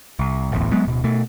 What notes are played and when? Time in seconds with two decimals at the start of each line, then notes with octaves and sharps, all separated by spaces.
0.19 C2
0.52 D1 A1 E2
0.72 F#3 G#3 B3
0.85 D1 B2
1.04 B2 A3